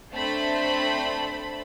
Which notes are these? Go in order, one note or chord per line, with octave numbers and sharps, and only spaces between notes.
A3 C4 D4 C5 A5 B5